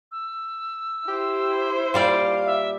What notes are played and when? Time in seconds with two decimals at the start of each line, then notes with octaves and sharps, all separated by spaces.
0.12 E6
1.08 E4 G4 C5
1.94 A#2 G3 D5 F5
2.46 E5